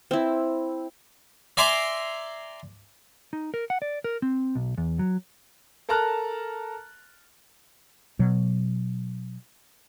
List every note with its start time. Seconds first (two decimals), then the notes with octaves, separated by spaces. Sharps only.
0.11 C4 E4
1.57 D5 E5 G#5 A#5 C6 D6
3.33 D#4
3.54 A#4
3.70 F#5
3.82 D5
4.04 A#4
4.22 C4
4.55 B1
4.78 E2
4.99 F#3
5.89 A4 A#4 A5 A#5 F6 F#6
8.19 B2 F#3